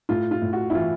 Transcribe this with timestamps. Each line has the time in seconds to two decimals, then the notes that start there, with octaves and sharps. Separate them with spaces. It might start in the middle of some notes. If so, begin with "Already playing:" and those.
0.09 A2 F4
0.31 F4
0.42 A2
0.53 F#4
0.70 E4
0.74 E3 F4